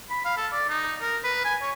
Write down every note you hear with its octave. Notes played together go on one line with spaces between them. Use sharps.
B5
F5
A4
D5
D#4
A#4
B4
G#5
C#5